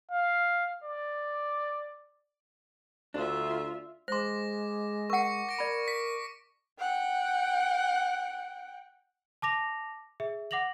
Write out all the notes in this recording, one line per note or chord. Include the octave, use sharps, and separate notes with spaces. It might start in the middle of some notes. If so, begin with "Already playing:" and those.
F5
D5
D2 D4 F4 E5
G#3 C5 C6 D6 A#6
A#4 F#5 C#6 C#7
D6 A#6 D7
A#4 D5 B5
B6
F#5 G5
A5 D6 A#6 F7
G#4 E5
F#5 D6 A#6 F7 F#7